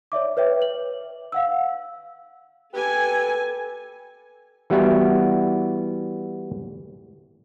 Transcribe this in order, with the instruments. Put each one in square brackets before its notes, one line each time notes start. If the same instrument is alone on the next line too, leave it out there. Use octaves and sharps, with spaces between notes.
[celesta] C#5 D5 E5 D6
B4 C#5 E5 G5
F#7
F5 F#5 E6
[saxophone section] G4 B4 [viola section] A4 G#5
[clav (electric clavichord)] E3 G3 B3 E4 F#4 G4